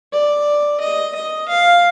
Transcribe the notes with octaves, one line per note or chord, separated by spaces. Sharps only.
D5
D#5
D#5
F5